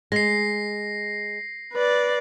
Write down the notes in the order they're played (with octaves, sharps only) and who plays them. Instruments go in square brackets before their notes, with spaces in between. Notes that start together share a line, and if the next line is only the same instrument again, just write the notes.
[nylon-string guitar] G#3 [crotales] A#6 C7
[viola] B4 D5